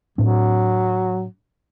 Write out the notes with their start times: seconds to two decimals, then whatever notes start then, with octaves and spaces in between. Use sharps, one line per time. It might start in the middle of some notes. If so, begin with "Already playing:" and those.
0.18 A2 F#3 C4 D4